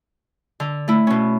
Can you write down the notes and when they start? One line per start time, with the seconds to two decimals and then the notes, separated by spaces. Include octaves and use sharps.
0.60 D3
0.88 A3 E4
1.07 B2 C#4